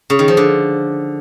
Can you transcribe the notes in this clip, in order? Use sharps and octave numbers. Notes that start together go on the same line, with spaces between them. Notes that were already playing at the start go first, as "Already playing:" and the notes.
C#3
D#3
F3
D3